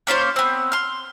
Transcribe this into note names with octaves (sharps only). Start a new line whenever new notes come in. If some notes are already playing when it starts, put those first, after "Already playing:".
A#3 C#4 F4 C5
B3 C4
C6 F6